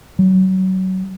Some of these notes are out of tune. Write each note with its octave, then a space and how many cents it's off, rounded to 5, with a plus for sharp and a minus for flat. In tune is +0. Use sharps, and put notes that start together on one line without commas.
F#3 +25